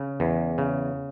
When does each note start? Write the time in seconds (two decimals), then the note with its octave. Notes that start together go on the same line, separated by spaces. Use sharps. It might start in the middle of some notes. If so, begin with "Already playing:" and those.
Already playing: C#3
0.20 E2
0.58 C#3